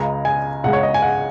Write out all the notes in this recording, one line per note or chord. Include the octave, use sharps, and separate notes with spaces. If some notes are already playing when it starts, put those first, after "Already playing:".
Already playing: C#2 C#3 G#3 A#5
G#5
C#2 C#3 G#3 F#5
C#5
D#5
G#5
F#5